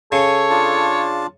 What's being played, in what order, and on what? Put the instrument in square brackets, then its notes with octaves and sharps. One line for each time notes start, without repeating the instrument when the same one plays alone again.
[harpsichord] C#3 [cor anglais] A4 [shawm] C#5
[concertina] D4 F4 A5